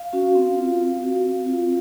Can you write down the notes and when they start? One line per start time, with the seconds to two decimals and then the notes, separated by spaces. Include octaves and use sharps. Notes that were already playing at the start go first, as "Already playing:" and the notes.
Already playing: F5
0.13 C#4 F#4
0.35 C4
0.57 F4
0.79 C4
1.02 F#4
1.24 C4
1.46 F4